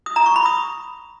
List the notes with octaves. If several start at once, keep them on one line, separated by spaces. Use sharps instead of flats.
D#6
A#5
C#6
B5
D#6